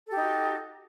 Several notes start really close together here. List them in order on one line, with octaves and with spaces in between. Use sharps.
A4 G4 D#4 F#4